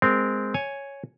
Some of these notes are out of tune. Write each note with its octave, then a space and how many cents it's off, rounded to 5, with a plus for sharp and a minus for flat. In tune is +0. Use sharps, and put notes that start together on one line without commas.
G#3 +0 C4 -15 A#4 +0
C#5 +0 G#5 +0